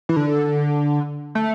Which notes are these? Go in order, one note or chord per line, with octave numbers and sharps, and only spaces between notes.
E3
D3
A3